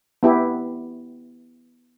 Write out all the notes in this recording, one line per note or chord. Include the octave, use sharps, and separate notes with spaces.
B3 E4 G4